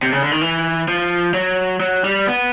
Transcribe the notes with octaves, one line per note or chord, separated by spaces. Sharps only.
C3
C#3
D3
D#3
E3
F3
F#3
F#3
G3
B3